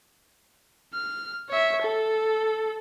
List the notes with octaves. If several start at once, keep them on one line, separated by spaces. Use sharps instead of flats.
F6
C#5 E5
A4